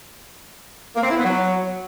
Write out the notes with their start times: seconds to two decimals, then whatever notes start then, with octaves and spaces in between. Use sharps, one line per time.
0.96 A#3
1.03 C4
1.10 E4
1.17 B3
1.24 F#3